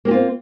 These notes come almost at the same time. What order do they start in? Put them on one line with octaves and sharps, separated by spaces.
A#3 G4 F4 C4